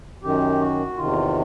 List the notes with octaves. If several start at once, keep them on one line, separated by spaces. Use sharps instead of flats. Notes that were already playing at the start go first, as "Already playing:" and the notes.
F#2 D#3 G4
F#4
E2 C3 D#3 F4